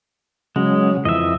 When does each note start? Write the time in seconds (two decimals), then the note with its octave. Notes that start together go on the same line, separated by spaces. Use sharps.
0.56 C#3 F#3 G#3
1.05 F2 E3 D#5 E5